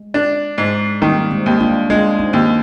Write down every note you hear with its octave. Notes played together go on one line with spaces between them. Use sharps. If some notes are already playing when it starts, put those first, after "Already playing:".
Already playing: G#3
D4
G#2
D#3 G3 A#3
G#3 C4
D#2
D4 F4
G#3 D4 F4
C4 D#4
D#2